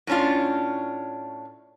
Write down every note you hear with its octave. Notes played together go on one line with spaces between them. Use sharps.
A2 A3 C#4 D4 F4